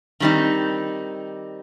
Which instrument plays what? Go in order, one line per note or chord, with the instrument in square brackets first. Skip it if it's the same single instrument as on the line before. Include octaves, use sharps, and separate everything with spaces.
[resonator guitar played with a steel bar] D#3 G3 C4 D#4